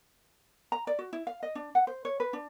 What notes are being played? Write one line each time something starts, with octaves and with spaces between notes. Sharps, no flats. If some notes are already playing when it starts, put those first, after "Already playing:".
A#5
D5
F#4
E4
F5
D#5
D4
F#5
C5
C#5
B4
D4